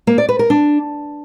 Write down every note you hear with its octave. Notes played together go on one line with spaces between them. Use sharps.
A#3
D5
B4
A#4
D4